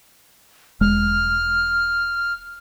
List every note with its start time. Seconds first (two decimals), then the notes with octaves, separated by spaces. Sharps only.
0.81 E1 G#3 F6